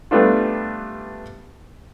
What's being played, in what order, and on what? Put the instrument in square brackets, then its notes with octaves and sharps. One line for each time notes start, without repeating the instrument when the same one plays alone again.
[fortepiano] G3 A3 B3 D4 F4